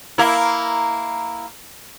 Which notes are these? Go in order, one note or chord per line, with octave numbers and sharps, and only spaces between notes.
A#3 E4